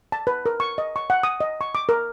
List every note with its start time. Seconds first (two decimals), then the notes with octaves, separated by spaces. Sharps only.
0.12 A5
0.27 B4
0.46 A#4
0.60 C#6
0.78 D#5
0.96 C#6
1.10 F#5
1.23 D#6
1.41 D#5
1.61 C#6
1.75 D6
1.89 A#4